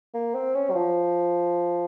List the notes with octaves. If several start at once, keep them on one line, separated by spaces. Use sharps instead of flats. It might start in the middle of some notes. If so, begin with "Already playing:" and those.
A#3
C4
C#4
F#3
F3